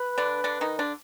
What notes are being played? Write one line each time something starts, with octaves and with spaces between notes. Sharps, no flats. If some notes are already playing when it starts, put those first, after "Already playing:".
Already playing: B4
D3 D4
D3 D4
D#3 D#4
D3 D4